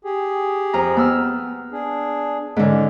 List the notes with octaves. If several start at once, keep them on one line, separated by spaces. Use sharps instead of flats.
G4 G#4
F2 F4 A#5
B3 E6 F6
D4 G#4
G#2 D3 C#4